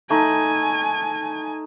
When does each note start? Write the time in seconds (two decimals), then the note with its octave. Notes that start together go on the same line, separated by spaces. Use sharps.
0.10 A3 D#4 G#5